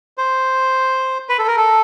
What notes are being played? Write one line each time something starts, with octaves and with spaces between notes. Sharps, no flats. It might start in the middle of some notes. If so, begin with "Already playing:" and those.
C5
B4
A4
A#4
A4